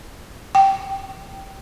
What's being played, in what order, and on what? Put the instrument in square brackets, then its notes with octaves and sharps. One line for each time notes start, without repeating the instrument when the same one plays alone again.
[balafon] G5